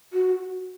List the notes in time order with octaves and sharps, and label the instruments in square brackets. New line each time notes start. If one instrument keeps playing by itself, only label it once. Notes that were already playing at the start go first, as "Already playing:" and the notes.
[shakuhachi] F#4